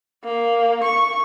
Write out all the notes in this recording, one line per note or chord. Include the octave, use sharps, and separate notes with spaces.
A#3
C#6